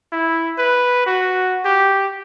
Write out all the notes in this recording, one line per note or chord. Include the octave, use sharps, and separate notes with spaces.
E4
B4
F#4
G4